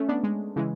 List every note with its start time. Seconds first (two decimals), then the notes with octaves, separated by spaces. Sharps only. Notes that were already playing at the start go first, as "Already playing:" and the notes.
Already playing: A3 C#4
0.08 B3 D4
0.23 G#3
0.56 C#3 E3 G#3